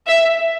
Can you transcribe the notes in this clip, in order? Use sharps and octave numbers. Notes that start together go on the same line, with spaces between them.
E5